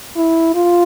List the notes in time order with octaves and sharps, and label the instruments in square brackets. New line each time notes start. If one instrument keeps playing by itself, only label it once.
[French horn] E4
F4